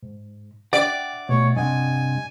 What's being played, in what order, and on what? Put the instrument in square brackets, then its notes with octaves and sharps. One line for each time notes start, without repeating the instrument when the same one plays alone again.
[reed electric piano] G#2
[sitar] D5 [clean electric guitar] E5 F#5 [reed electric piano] G5
[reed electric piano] B2 A3 [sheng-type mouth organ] C#5
[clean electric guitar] G2 C3 [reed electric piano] D#5 F#5 [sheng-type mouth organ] G#5